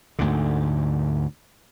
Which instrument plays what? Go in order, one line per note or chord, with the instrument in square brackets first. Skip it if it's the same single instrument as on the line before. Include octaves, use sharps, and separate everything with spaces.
[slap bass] D2 G#2 D3